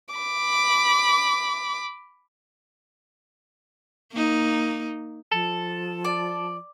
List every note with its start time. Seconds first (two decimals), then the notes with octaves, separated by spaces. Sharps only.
0.15 B5 D6
4.12 A#3 D#4
5.31 F3 A4
6.05 D5